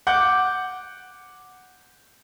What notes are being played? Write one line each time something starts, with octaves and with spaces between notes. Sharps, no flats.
F#5 D6 G6